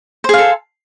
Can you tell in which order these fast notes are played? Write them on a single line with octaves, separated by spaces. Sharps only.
C5 G#4 F5 A4